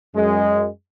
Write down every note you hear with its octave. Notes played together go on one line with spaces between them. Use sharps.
F#2 G#3